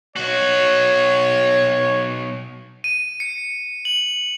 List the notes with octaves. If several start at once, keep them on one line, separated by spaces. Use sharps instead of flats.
B1 F#4 C#5
D#7
C#7
F#7